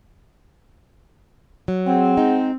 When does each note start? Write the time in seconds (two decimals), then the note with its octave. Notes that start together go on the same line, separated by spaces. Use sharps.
1.68 F#3
1.86 C4 G#4 F#5
2.17 G#3 D#4